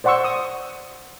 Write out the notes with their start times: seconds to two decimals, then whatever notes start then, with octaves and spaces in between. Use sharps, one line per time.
0.04 C5 D5 F#5 C6 C#6 E6
0.24 D#6